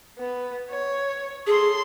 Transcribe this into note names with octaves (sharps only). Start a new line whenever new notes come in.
B3
C#5
G#4 A4 C6